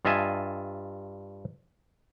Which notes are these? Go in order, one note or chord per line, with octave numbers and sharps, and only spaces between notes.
G2 F4 D#5 E5 G#5 A5